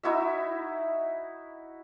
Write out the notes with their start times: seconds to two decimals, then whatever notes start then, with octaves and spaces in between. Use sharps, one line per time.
0.03 D#4 E4 F#4 E5